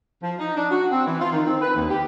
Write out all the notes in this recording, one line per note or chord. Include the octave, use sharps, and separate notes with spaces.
F3
D#4
D4
F#4
C4
E3
F4
D#3
C4
B4
D#2
G4